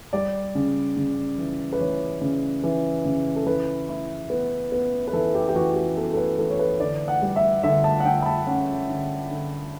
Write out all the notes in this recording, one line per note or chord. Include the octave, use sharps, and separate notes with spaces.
G3 D5
C#3
C#3
E3
B4
E3 C#5
C#3
E3
C#3
A4
E3 B4
E4
B3
B3
B4
E3 A4
G4
G4
E3 F#4
F#4
G4
B3 A4
A4
B4
E3 A4
C#5
B4
D3 D5
F#5
G3
E5
D3 E5
A5
F#5
D3 G5
B5
A5
C#4 F#5
D3
D3